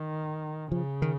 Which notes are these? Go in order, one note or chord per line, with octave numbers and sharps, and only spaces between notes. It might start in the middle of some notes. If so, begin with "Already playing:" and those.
Already playing: D#3
C#3 F3
D#3